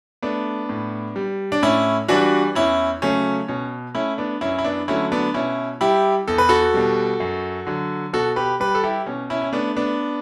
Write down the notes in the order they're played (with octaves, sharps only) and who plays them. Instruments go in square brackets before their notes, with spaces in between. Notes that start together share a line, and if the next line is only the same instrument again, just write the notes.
[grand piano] A3 B3 D4
A2
G3
D4
A2 C#4 E4
E3 G3 D4 F#4
E2 C#4 E4
C#3 F#3 A3 C#4
B2 C#4
A3 C#4 E4
B3 D4
F#2 C#4 E4
E4
B3 D4
D3 F#3 A3 C#4 E4
B3 D4
B2 C#4 E4
G3 E4 G4
E2 A4
B4
F#4 A4
B2 G3
F#2
D3 F#3
B2 F#4 A4
G4 B4
G3 G4 B4
A4
E4 G4
B2 C#4
C#4 E4
C#4
A3 B3 D4
B3 D4